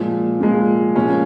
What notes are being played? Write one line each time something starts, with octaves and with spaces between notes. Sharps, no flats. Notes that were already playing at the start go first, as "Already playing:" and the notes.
Already playing: A#2 F3 G#3
A#2 F3 G#3
A#2 F3 G#3 C#4